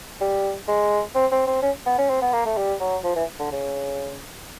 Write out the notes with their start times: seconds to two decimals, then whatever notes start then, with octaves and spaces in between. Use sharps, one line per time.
0.21 G3
0.68 G#3
1.15 C4
1.32 C4
1.47 C4
1.62 C#4
1.86 B3
1.98 C#4
2.10 C4
2.22 B3
2.33 A#3
2.46 A3
2.57 G3
2.80 F#3
3.04 F3
3.16 E3
3.39 D3
3.52 C#3